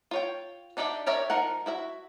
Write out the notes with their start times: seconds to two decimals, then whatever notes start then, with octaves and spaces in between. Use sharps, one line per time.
0.11 F4 C#5 G5
0.77 D4 D#4 G4 D5 E5
1.07 G4 A#4 C#5 D5 E5
1.30 F3 D#4 A#4 F#5
1.66 E4 F#4 E5